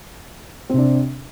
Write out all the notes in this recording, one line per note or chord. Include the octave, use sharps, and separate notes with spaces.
C3 C4 D4